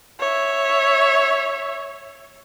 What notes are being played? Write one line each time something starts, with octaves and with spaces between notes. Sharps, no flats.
C#5 E5